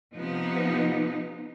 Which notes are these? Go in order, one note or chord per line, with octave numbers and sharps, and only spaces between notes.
C3 F3 B3 D#4